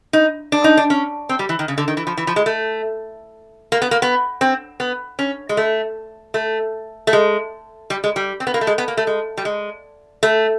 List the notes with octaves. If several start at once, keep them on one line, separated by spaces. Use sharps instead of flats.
D#4
D4
D#4
D4
C#4
C4
G3
E3
D#3
C#3
D3
D#3
E3
F3
E3
F3
G#3
A3
A#3
B3
A#3
B3
C4
B3
C#4
G#3
A3
A3
A3
G#3
G3
G#3
G3
C4
B3
A#3
A3
G#3
B3
A#3
A3
G#3
G3
G#3
A3